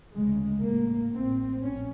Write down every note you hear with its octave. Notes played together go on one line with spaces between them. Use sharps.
D2 C#3 G#3
A1 A2 A#3
A1 A2 C4
A#1 C#4